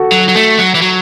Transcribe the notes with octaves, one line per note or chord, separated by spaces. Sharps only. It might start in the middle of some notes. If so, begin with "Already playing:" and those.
Already playing: F#4 A4
F#3
F#3
A3
F#3
E3
F#3